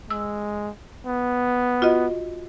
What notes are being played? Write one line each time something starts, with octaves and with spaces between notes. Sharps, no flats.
G#3 E6
B3
F4 F#4 D#5